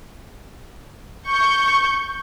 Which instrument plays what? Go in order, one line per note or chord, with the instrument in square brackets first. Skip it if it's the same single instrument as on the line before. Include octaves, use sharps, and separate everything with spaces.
[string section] C#6 G6